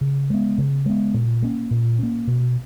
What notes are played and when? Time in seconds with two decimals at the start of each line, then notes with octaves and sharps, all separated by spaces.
0.01 C#3
0.30 G#3 B3
0.58 C#3
0.86 G#3 B3
1.14 A#2
1.42 A#3 C#4
1.71 A#2
1.99 A#3 C#4
2.27 B2